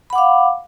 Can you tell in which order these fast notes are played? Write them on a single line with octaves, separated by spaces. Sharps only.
B5 F#5 D6 F5